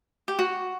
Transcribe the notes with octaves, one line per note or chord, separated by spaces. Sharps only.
G4
F#4